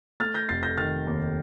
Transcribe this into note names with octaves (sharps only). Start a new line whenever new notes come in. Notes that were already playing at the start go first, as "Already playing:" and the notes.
A3 F6 A6
G6 A#6
F1 A6 C7
G6 A#6
D#3 F6 A6
D#2